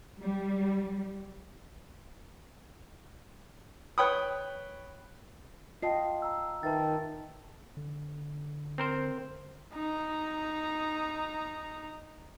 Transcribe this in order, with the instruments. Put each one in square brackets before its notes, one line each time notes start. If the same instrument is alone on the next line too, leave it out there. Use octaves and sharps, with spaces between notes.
[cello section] G3
[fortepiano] B4 C#5 G5 B5 D#6
[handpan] F4 D#5 [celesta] G5 A5 C7
[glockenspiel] A#5 E6
[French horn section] D#3 [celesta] B4 E5 G5 [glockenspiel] A5 A6
[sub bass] D3
[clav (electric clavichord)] C4 A#4 C5
[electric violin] D#4 A#5